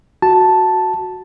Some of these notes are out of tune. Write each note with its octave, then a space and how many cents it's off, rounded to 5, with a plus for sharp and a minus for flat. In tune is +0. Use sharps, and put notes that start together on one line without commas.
F#4 +0 A5 +0